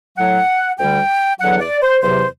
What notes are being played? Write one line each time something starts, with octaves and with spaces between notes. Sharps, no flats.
A2 F#3 F#5
D2 D3 G3 G5
E2 D3 F#3 F#5
D5
C5
E2 C3 F#3 C5